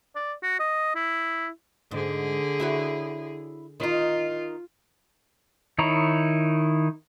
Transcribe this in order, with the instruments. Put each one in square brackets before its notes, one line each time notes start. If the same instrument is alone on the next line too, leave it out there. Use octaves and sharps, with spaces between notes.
[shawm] D5
F#4
D#5
E4
[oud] G#2 [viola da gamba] D3 G#4
[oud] E4 F#4 C#5
[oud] D#3 D#4 [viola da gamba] F4
[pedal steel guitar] D#3 D#4 E4 C#5 A#5